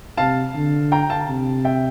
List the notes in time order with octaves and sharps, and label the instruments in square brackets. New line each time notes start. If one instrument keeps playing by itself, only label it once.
[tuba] C3 [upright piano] F5 A5
[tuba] D3
[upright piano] G5 A#5
F5 A5
[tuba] C3
[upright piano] E5 G5